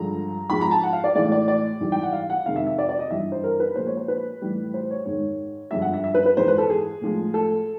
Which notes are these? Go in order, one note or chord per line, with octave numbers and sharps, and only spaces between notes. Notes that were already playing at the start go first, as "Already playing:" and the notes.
Already playing: G2 D3 F3 G#3 A#5
G#2 F3 G#3 B5
A#5
A5
F#5
F5
D5
A2 E3 G#3 D5
D5
D5
G#2 E3 G3
G5
F#5
F5
F#5
F2 C3 D#3 G#3 F5
E5
E5
D5
D5
D#5
G2 E3 G3 E5
C5
A#4
B4
A#2 F3 G#3 C5
C#5
C5
B4
A2 E3 G3
C5
C#5
G#2 D#3 G#3 C#5
G2 D3 F3 G#3 E5
F#5
E5
E5
B4
B4
G#2 E3 G#3 C5
B4
A4
G#4
A2 F3 G#3
A4